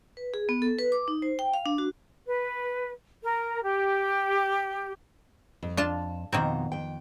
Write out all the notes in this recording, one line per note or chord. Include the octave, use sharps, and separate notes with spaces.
B4
G#4
B3
A4
B4
D6
D#4
C5
G5
F5
D4
F#4
B4
A#4
G4
F2
D4 F4 A5
F2 B2 D#3 A#3 C4 A#5
F2 G5